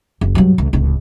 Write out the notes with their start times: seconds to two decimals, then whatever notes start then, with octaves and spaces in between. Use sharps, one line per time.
0.21 F#1
0.35 G2 F#3
0.58 C#2
0.73 D1 C#2